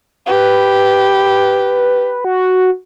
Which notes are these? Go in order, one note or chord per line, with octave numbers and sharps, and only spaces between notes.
G4 B4
F#4